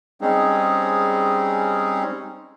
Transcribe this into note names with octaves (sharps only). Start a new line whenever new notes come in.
G3 G#3 C4 C#4 D#4 G#4